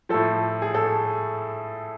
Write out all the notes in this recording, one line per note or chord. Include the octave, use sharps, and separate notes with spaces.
A2 F3 A4
G#4
A4